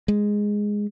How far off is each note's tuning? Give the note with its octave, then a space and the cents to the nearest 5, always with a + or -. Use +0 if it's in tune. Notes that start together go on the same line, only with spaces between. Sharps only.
G#3 -5